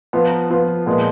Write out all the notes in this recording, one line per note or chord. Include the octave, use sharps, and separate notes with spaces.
F3 B3 F4
F3 B3 F4
A#2 F3 G#3 B3 F4